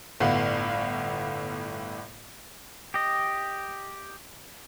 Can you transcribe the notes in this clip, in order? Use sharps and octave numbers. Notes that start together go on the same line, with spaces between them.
G1 A2 B3 F5 F#5
G4 D#5